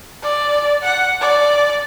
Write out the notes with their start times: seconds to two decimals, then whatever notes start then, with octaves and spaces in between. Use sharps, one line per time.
0.23 D5
0.83 F#5
1.21 D5